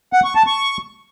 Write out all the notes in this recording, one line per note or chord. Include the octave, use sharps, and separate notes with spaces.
F#5
C#6
A5
C#6